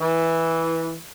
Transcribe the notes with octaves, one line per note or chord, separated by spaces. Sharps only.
E3